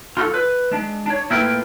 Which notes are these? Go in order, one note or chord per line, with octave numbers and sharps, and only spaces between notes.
F4 F#4 A4
B4
G#3 D4
D4 C#5
A2 A#3 E4 F4 B4 G5